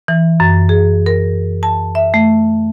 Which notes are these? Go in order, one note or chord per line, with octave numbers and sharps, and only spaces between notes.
E3
F#2
G#4
A#4
A5
E5
A3